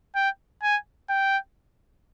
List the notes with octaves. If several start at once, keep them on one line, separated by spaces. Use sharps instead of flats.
G5
G#5
G5